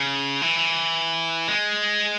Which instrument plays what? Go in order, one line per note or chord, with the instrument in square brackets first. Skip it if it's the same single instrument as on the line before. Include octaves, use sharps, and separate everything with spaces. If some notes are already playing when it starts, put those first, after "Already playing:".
Already playing: [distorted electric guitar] C#3
E3
G#3